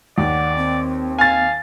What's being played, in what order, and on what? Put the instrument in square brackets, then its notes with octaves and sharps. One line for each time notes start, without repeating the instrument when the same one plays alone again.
[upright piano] D#2 [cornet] D5 [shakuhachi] F#5
[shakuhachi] C4
[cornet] F5 [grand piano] G#5 A6